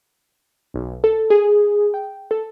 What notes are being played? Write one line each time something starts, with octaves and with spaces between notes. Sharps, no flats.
B1
A4
G#4
G5
A4